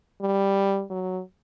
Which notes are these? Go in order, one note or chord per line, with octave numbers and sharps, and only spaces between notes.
G3
F#3